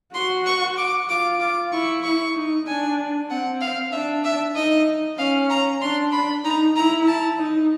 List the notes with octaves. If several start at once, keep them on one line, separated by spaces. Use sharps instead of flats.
F#4 C6
C#6
D6
F4 D6
D6
E4 C#6
C#6
D#4
D4 G#5
C4 F#5
F5
D4 E5
E5
D#4 D#5
C#4 F5
A#5
D4 C6
B5
D#4 A#5
E4 A#5
A5
D#4